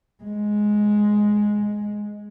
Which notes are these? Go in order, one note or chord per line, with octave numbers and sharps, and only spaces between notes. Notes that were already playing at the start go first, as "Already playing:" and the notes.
G#3